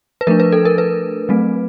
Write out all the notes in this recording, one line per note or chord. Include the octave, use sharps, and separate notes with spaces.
B4
F3 A3 D4 A#4
B4
A4
A#4
B4
F#3 A3 C4